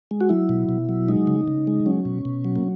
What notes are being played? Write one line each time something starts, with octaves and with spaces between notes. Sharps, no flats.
G#3
F#4
F#3 E4
B2
B2
F#3
G#3 D#4
C#3
C#3
G#3
F#3 C#4
B2
B2
F#3
A#3